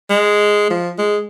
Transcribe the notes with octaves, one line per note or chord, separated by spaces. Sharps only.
G#3
F3
G#3